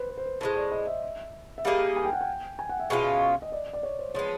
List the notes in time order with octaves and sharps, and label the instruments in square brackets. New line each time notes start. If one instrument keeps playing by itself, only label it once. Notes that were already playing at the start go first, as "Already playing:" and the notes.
Already playing: [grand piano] B4 C5
B4
C5
B4
[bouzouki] A2 E3 G#3 [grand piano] C5
[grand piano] D5
D#5
E5
E5
[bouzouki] G3 A#3 D#4 G#4 [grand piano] F5
[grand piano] G#5
G5
F#5
G5
G#5
F#5
E5
[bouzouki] B2 G#3 C#4 F4
[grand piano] D#5
D5
D5
C#5
C5
[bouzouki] F3 G#3 B3 [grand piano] C#5